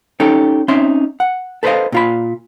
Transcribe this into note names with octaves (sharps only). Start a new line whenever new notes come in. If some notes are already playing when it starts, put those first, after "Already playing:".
C#4 D#4 G4 A4 C#5
C4 C#4 D#4 E5 C6
F#5
A4 B4 C5 D5 D#5 F5
A#2 F4 B5